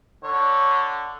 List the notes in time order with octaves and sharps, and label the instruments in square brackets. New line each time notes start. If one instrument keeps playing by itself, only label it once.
[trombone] D3 [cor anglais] C#5